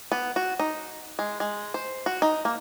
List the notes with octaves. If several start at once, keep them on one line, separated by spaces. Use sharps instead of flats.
B3
F#4
D#4
G#3
G#3
C5
F#4
D#4
A#3